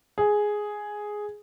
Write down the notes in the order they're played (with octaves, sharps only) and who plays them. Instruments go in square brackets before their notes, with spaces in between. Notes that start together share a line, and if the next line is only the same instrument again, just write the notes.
[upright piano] G#4